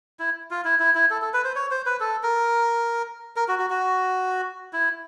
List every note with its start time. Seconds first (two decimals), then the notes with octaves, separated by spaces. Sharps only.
0.19 E4
0.51 F4
0.65 E4
0.80 E4
0.95 E4
1.10 A4
1.22 A4
1.34 B4
1.44 C5
1.56 C#5
1.71 C5
1.86 B4
2.00 A4
2.23 A#4
3.36 A#4
3.48 F#4
3.59 F#4
3.70 F#4
4.73 E4